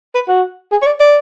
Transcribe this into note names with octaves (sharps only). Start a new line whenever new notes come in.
B4
F#4
G#4
C#5
D5
D5